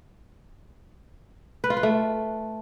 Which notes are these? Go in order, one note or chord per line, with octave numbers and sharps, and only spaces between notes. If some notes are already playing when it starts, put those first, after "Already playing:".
B4
F4
B4
A3